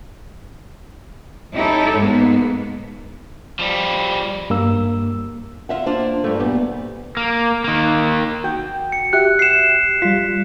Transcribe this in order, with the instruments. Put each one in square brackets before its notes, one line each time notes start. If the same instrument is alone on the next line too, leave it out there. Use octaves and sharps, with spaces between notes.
[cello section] D#4 E4 G4 A4 C#5
G#2 G#3 A#3 B3
[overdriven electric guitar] F3 G3
[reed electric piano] G2 A#3 E6
[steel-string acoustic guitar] D3 F4 [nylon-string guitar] E5 F#5
[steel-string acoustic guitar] A#3 F4 C5 [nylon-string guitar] D4
[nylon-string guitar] G2 A3
A#2 G3 B3
[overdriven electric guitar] A#3
D#3 A#3
[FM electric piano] F#4 G5
[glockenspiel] C#7
[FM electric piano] F#4 G4 E5 [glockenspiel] F#6
[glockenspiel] C7 E7
[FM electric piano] G3 F4 [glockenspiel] B6